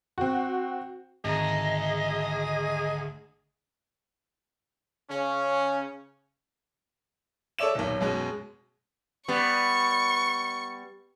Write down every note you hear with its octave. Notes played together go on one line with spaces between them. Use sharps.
C4 F#4
G#1 D2 G#4 D#5 A#5
C#3 C#4
A4 C#5 D5 E5 E7
D#1 B1
F#2 B2 G#3
G3 B3 C#6